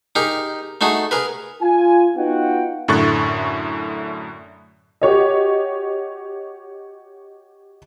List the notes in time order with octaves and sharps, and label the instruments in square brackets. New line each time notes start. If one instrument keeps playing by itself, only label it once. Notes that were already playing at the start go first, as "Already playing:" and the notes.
[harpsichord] D#4 G4 G#4 A#4
A3 D#4 F#4 G#4
G#4 A#4 B4
[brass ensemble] F4 G#5
B3 D#4 F4 F#4 F#5 G5
[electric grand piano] F#2 A2 D3 C#6 F#6 A6
[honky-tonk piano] F#4 G4 C#5 D#5